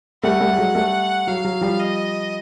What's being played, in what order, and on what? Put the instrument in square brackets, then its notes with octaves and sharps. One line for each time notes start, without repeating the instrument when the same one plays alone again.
[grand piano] G3 A3 [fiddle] F#5
[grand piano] G3 A3
G3
F#3 G#3
G3 A3
[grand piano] F#3 [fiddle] F5
[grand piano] F#3
F3 G3
[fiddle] D#5